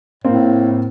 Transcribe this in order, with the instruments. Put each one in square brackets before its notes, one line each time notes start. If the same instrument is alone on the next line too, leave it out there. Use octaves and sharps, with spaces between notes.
[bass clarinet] A2 [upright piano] A#3 C4